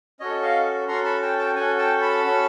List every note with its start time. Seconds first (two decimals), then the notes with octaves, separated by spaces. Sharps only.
0.20 C#4 F#4 A4 C#5 D#5
0.42 D#5 F5
0.88 C#4 F#4 A4 A#5 C6
1.05 A5 B5
1.22 G5 A5
1.39 G5 A5
1.56 C#4 F#4 A4 F#5 G#5
1.79 G5 A5
2.02 A5 B5
2.25 C#4 F#4 A4